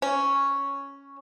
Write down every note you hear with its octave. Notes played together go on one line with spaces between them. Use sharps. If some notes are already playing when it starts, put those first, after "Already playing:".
C#4